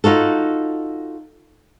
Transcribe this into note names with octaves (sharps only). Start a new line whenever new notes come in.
D#4 F4 F#4 A4